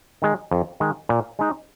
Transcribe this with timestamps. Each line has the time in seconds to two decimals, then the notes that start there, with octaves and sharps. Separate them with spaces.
0.22 D#3 G#3
0.51 F2
0.80 D#3 G#3
1.09 A#2
1.39 G#3 D#4